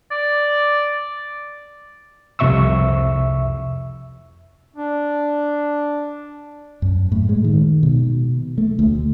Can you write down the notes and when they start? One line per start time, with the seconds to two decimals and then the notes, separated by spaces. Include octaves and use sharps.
0.11 D5
2.39 C2 F2 C3 E5 C#6 E6
4.76 D4
6.82 F#2
7.12 A2
7.29 G#3
7.44 D#3
7.83 B2
8.58 A3
8.79 D2